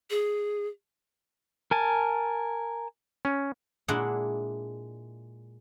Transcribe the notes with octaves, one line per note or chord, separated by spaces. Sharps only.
G#4
A#4 G#5 A5
C#4
A#2 G#3 D4 E4 G#4 F#5